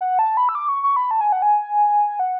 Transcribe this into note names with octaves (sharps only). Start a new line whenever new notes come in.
F#5
A5
B5
E6
D6
C#6
C#6
B5
A5
G#5
F#5
G#5
F#5